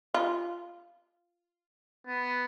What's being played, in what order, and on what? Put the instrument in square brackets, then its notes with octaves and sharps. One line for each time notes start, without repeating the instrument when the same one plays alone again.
[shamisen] F4
[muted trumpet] B3